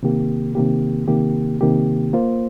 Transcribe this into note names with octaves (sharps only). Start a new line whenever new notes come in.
C3 D#3 A#3 G4
C3 D#3 A#3 G4
C3 D#3 A#3 G4
C3 D#3 A#3 G4
A#3 F4 C5